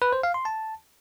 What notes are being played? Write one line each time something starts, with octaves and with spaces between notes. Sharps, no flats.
B4
C5
F5
C6
A5